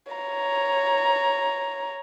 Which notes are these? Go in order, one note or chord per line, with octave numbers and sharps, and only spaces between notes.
C#5 A#5